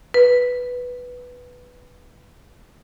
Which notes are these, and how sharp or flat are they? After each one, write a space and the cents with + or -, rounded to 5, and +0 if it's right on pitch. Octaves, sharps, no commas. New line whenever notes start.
B4 +0